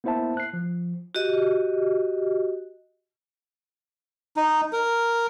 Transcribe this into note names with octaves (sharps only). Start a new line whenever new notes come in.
A#3 B3 E4 C5 E5 A5
F#6 C7
F3
F#4 G4 D#5
D#4
A#4